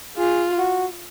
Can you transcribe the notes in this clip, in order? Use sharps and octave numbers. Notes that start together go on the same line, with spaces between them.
F4 G#4
F#4